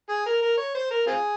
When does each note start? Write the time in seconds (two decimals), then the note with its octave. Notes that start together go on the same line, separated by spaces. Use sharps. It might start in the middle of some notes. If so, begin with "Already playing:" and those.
0.09 G#4
0.26 A#4
0.42 A#4
0.57 C#5
0.75 C5
0.90 A#4
1.07 C4 F4 G#4